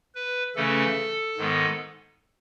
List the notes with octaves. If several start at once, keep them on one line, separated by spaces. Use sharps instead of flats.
B4
C#3 E3 A3 C#4 A4
G#2 D#3 G#3 B3